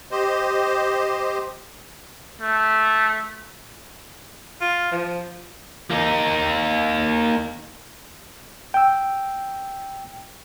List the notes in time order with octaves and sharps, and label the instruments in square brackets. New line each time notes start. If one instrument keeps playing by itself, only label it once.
[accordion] G4 C5 D#5
[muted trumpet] A3
[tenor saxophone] F4
F3
[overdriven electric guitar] A#3 D#4
[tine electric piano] G5 E6